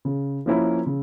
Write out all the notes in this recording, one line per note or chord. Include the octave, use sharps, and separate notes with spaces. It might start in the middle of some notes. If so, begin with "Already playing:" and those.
C#3
F3 A#3 C#4 E4
C#3